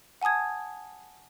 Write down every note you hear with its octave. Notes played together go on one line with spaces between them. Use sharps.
F#5 G#5 A5 D#6 G#6